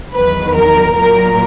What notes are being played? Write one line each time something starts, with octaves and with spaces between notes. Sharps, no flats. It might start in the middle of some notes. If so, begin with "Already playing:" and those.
E2 D#3 F#3 B4
A#4
A#2 F#3 A#4